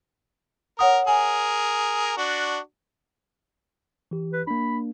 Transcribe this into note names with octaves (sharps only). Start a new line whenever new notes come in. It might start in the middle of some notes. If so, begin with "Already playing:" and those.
A#4 C#5 F#5 D#6
G#4 A#4 G#5
D4 F#4
E3 G4
B4
A#3 D4 B5